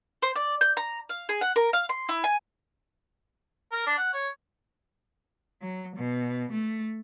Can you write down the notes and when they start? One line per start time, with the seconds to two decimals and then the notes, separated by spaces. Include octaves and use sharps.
0.22 C5
0.36 D5
0.61 G6
0.77 A#5
1.09 F5
1.29 G#4
1.41 F#5
1.56 A#4
1.73 F5
1.89 C6
2.09 E4
2.24 G#5
3.72 A#4
3.87 D4
3.98 F#5
4.13 C#5
5.61 F#3
5.96 B2
6.52 A3